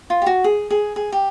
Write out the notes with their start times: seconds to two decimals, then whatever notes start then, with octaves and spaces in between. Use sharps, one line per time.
0.10 F4
0.22 G4
0.26 F#4
0.44 G#4
0.70 G#4
0.96 G#4
1.12 G4